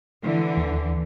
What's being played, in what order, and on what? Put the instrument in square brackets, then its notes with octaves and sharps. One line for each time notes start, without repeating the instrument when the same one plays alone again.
[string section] D3 E3
[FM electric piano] D#2